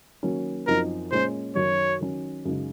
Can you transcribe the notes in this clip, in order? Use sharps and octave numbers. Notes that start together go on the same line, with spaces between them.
D#3 F#3 A#3 C#4
F#2 F3 C4 D#4 A#4
A#2 G#3 C#4 C5
F#2 D#3 F#3 C#5
D#3 F#3 C#4
F#2 C#3 G#3 D#4